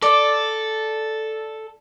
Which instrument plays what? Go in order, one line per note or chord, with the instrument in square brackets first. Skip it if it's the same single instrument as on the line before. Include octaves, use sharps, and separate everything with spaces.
[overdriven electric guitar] A4 [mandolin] D5